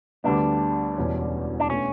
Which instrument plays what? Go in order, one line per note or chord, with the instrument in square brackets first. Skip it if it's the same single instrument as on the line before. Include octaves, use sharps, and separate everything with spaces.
[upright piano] D2 D3 G3 B3 [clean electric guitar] D4
[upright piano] E1 E2 B2 G3 C#4
[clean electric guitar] D4
[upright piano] B2 A3 D4 [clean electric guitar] C#4